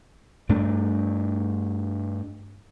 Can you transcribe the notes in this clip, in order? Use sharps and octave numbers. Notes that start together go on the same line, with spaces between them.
G2 A3 D4